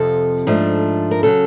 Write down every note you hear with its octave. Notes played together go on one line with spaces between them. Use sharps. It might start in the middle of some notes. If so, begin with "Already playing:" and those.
Already playing: F2 C3 F3 A4
G#2 F3 A3 D4
A#4
C#3 F#3 A4